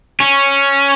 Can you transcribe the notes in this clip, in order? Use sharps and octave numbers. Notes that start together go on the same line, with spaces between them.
C#4